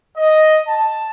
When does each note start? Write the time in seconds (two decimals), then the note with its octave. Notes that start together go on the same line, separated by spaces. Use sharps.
0.17 D#5
0.68 A5